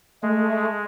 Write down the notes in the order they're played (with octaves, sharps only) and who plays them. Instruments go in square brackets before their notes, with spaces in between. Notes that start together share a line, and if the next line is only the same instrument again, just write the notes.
[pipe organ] G#3 [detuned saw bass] A3